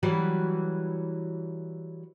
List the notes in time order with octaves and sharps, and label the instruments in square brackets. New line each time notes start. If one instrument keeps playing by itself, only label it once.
[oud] E3 F#3 G3